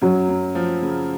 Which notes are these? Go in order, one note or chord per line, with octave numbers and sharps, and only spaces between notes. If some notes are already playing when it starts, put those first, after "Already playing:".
F#2 F#3
F#2
F3
C#3